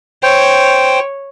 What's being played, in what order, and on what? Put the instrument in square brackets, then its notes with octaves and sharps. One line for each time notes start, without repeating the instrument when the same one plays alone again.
[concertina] C5 G5 [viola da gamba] C#5